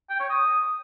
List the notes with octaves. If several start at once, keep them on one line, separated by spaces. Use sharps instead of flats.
G5
C#5
D#6